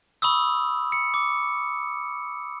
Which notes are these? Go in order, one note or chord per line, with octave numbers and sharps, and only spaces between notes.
B5 C#6 D#6 E6
C#7
D6